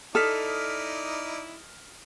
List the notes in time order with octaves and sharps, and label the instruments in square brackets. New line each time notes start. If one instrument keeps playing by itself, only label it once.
[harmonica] D#4 E4 D5 [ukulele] A4 [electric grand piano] D#6 F6 B6